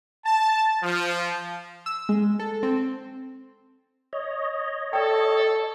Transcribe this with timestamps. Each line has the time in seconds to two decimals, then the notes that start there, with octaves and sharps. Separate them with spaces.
0.24 A5
0.82 F3
1.86 E6
2.09 G#3
2.39 A4
2.63 C4
4.13 C#5 D#5
4.93 A4 D5 G5